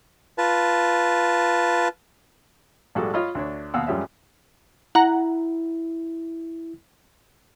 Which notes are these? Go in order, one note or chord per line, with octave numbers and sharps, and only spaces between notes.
F4 B4 A5
A#1 G#2 G3 F#4 G#4 A4
F4 C#5 D#5 F5 B5 F6
D2 D4 C#5
D#2 B2 F5 F#5 D#6 E6
F#2 F3 G3 G#3 C#4 E5
E4 F#5 A#5